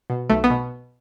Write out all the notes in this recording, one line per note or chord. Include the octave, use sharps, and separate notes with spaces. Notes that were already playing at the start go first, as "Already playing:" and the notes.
B2
B1 A3
B3
B2